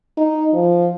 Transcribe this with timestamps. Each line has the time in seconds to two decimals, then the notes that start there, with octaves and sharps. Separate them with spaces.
0.17 D#4
0.53 F3